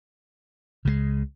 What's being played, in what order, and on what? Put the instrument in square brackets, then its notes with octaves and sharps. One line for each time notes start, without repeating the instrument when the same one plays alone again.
[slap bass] C#2 C#3 E3 G#3